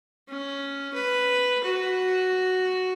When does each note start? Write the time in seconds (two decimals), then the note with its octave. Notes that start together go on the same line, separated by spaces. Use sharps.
0.28 C#4
0.94 B4
1.64 F#4